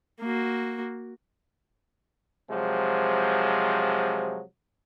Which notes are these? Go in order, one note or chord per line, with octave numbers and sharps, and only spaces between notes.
A#3 F#4
C3 F3 F#3 G#3